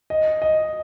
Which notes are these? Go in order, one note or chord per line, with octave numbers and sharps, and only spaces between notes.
D#5
D#5